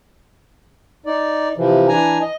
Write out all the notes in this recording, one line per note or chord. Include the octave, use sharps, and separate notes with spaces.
D#4 D5
C3 E3 F3
E3 D4 G#5 A#5
D#5